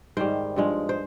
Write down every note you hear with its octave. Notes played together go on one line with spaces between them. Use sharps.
G#2 D#3 G3 C5
G2 F3 G#3
C5